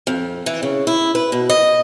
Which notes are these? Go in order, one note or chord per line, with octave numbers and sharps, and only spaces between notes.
F2
E3
C#3
E4
B4
B2
D#5